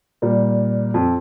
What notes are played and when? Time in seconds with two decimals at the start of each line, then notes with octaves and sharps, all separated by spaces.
0.22 A#2 G3
0.94 F2